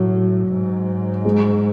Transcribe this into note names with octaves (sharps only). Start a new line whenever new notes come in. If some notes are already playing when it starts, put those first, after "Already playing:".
Already playing: A2 F#3
G#2
G#3